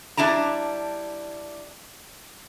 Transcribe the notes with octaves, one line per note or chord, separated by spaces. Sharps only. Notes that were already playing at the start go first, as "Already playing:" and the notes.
G3 D4 E4 A5 A#5